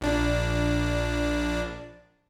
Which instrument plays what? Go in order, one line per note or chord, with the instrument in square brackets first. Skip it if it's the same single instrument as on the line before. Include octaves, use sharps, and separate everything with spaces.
[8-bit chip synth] A#1 D4